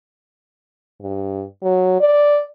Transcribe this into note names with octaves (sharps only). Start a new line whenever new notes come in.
G2
F#3
D5